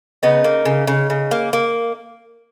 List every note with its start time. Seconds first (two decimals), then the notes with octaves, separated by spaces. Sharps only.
0.23 C#3 B3 D#4
0.44 A#3
0.66 C#3
0.87 C#3
1.10 C#3
1.31 A#3
1.53 A#3